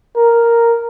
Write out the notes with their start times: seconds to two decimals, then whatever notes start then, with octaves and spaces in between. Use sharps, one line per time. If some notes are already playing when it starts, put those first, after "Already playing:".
0.16 A#4